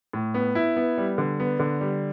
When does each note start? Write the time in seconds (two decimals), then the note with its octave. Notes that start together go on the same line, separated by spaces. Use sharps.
0.13 A2
0.34 B3
0.55 E4
0.77 B3
0.98 G3
1.18 D3
1.40 B3
1.59 D3
1.81 G3